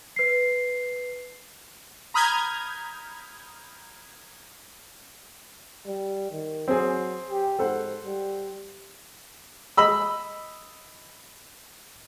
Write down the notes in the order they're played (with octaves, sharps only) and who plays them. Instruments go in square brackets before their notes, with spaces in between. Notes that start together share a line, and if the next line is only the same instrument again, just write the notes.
[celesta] B4 C7
[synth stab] A#5 B5 D#6 F6 G6 G#6
[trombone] G3
D#3
[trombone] F#3 [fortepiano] C4 G#4
[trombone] G4
[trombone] G#2 [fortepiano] A4 C5 F#5
[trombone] G3
[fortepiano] D#5 B5 E6